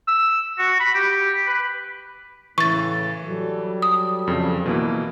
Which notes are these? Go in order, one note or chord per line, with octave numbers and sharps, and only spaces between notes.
E6
F#4
B5
G4
B4
A2 C#3 E3 C#6 A6
F#3 G3 A4
D#6
F2 C#3
B2 E3 A#3